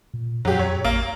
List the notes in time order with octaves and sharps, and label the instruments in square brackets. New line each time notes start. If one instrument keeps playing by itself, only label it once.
[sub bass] A#2
[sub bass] F2 [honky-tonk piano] F#3 G4
[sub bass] F2 [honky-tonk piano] C#5
[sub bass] A1 [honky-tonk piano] A#3